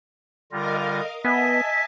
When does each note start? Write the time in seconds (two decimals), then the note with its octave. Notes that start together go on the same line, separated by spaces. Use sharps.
0.52 D3 G3 F4 A#4 D#5 F5 A#6
1.25 B3 D#5 E5 G#5 A5 B6